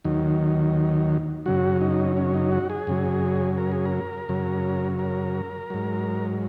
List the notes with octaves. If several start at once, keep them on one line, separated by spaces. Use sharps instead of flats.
D#2 D#3 F#3
F#2 C#3 F#3 F#4
D#4
C#4
D#4
F#4
G#4
F#2 C#3 F#3
A#4
G#4
A#4
F#2 C#3 F#3
A#4
G#2 F#3